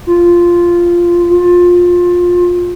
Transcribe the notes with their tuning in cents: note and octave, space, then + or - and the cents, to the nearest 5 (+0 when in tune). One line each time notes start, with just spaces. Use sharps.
F4 -5
F4 +20